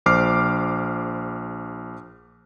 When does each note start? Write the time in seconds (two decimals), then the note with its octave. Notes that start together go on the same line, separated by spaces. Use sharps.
0.06 A#1 C5 D6 F6 C7